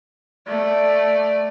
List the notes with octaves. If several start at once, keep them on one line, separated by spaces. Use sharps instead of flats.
A3 D5